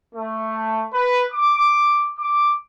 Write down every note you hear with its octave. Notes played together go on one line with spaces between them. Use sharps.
A3
B4
D6
D6